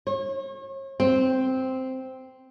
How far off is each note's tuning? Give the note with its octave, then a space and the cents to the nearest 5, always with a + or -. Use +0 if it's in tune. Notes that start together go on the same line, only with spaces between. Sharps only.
C#5 -40
C4 -5